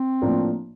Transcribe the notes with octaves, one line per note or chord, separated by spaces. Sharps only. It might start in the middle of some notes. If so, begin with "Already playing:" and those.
Already playing: C4
A2 F3 A#3 D4